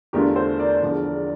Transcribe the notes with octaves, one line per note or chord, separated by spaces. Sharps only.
E2 D3 A3 D4 F4 G4 A#4
A4 C5
A#4 D5
E1 E2 D3 F3